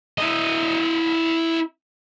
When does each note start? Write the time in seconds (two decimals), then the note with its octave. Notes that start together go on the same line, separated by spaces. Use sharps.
0.18 E4 D#5